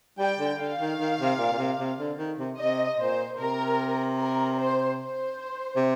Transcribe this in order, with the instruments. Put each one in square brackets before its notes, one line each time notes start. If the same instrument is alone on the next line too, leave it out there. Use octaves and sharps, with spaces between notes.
[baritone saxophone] G3 [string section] G5
[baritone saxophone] D3
[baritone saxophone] D3 [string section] F5
[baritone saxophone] D#3
D#3
C3
A#2
A#2
C3
C3
D3
D#3
C3
[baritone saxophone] C3 [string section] D#5
[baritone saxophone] A#2 [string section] C5
[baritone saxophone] C3 [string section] A#4
[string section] A#4
C5
C5
[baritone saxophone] C3